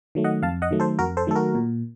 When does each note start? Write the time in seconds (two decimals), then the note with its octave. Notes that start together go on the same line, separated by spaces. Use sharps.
0.15 D#3 F#3 A3
0.24 D#5 F#5
0.42 F2 F5 A5
0.62 D#5 F#5
0.71 D#3 F#3 A3
0.80 A4 C5
0.99 F2 F#4 A#4
1.17 A4 C5
1.27 D#3 F#3 A3 A4
1.35 F#4 A#4
1.55 A#2